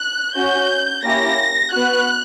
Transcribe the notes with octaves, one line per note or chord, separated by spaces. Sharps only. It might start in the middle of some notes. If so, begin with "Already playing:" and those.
Already playing: F#6
C#4 F#4 G6
A#3 C#4 E4 G4 A#6
B3 F#4 F#6